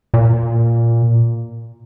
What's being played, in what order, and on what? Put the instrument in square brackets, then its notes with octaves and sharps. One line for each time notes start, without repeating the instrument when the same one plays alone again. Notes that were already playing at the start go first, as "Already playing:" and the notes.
[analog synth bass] A#2